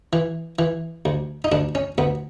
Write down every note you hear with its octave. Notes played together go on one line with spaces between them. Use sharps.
E3
E3
D2
D#4
D2 D4
C#4
D2 B3